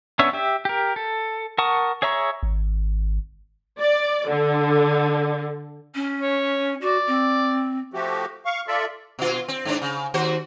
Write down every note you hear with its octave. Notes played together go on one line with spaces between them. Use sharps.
B3 C#4 D4 C#5 E5
G4 E5
G4 A#4
A4
A#4 F#5 A5 C#6 D#6
G#4 C#5 E5 A#5 C#6
G#1
D5
D3
C#4
C#5
F#4 D5
C4
F3 A3 F#4 G4
F5 C#6
F4 A4 D5 E5
B2 F4
C4
G#2 D4
C#3
D#2 F#4 C5